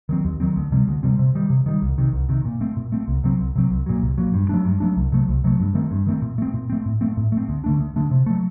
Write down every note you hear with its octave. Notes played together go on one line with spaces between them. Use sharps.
D#3 F#3 C4
D#2
D#3 F#3 C4
D2
C3 G3 C4
D2
C3 G3 C4
C3
D#3 G3
C3
D#3 G3
C2
C3 D#3
C2
C3 D#3
A#2
A3 C4
A#2
A3 C4
C2
C3 F#3 C4
C2
C3 F#3 C4
C2
A#2 F#3
C2
A#2 F#3
G2
F#3 A3 D4
G2
F#3 A3 D4
C2
C3 F#3 A3
C2
C3 F#3 A3
G2
D#3 A3 C4
G2
D#3 A3 C4
A#2
A3 C4
A#2
A3 C4
A2
A3 C4
A2
A3 C4
D2
D3 A3 D4
D2
D3 A3 D4
C3
F#3 A3